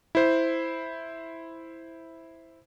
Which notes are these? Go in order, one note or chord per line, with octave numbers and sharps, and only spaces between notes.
E4 C5